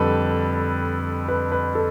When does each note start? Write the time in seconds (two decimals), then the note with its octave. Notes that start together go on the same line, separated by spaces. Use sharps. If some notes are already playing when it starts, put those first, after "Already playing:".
Already playing: F2 D3 G3 A4 B4
1.28 B4
1.52 B4
1.75 A4